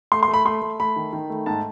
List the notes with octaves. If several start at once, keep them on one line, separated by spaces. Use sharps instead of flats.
A3 C6
C6
A3
B5
A3 C6
A3
A3 B5
D#3
D#3
A3
G#2 A5